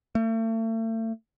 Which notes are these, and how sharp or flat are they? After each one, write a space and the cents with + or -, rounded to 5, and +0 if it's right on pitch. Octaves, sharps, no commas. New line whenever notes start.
A3 +40